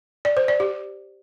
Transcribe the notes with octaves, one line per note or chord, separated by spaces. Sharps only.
D5
C5
D5
G4